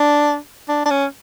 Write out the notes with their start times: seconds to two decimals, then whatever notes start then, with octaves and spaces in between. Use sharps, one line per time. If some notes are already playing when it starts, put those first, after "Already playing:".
Already playing: D4
0.68 D4
0.86 D4
0.91 C#4